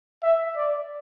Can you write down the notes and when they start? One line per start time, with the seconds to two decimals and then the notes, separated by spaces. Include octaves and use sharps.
0.23 E5
0.56 D5